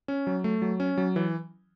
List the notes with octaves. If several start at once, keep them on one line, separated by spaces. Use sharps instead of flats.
C#4
F#3
A3
F#3
C#4
F#3
E3